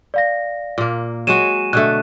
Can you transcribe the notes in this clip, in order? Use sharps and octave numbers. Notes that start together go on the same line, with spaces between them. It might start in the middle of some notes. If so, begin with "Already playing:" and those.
D5 F5 A#6
A#2 A#3
F#3 G#3 F#4 D#7 E7
B2 D3 A3 F#6